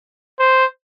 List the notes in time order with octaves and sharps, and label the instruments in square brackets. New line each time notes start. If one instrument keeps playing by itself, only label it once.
[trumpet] C5